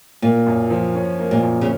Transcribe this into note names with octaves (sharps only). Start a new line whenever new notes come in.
A#2 A#3
F#2
F3
C#4
A#3
A#2
F#2
C#3